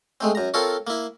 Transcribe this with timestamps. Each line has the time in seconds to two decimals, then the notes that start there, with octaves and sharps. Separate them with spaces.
0.21 G#3 A3 C4
0.35 F#2 A#5
0.54 C4 F4 A4 A#4 C#5
0.87 A#3 E4